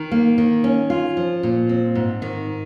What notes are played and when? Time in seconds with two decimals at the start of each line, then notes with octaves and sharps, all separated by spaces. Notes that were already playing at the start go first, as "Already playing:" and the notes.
Already playing: D#3
0.12 A#3
0.38 D#3
0.64 C#4
0.90 F4
1.17 F3
1.43 A#2
1.69 C4
1.95 G#2
2.22 D#3